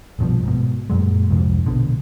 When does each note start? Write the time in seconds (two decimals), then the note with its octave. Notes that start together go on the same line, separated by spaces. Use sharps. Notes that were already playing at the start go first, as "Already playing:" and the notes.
0.19 A#1 G2 B2 F3
0.43 G#2 B2
0.90 F#2 A#2 F#3 G#3
1.30 C2 F2 G#2
1.66 A#1 B2 D3